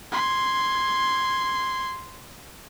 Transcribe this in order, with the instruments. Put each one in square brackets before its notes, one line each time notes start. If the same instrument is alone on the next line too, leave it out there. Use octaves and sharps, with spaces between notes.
[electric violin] C6 G#6